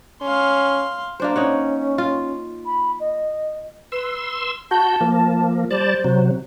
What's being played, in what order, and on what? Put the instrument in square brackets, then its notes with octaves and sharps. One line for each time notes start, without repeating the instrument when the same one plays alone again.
[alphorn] C#4 [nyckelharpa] F5 C6
[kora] A#3 D4 C5
[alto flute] C#4 [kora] D#4 C#5 F#5
[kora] F4
[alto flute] B5
D#5
[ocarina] B4 [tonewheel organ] C6 E6
[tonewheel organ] F#4 G6 [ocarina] A5
[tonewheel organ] F3 A#3
[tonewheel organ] G3 D5 A5 [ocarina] C5
[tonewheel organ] C3 F#3